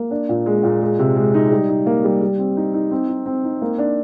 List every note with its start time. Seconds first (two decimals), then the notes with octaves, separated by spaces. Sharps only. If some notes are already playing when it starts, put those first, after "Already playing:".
Already playing: A#3
0.11 D4
0.29 A#2
0.46 G#3
0.63 A#2
0.81 G#3
0.99 C3
1.16 G#3
1.34 D#4
1.51 G3
1.69 D#4
1.86 A#3
2.04 G3
2.21 G3
2.38 C4
2.57 D#4
2.74 D#4
2.91 C4
3.09 D#4
3.26 C4
3.44 D#4
3.62 A#3
3.78 D4